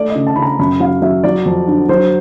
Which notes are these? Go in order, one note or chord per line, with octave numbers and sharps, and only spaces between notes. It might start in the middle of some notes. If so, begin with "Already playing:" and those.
Already playing: A3 D5
D#5
C#3
A5
C#3 B5
A#5
F#2 B5
F#3 F5
F#3 E5
F#3 D5
F2
D3
F#3 C5